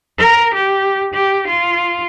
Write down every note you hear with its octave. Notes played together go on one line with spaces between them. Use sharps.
A#4
G4
G4
F4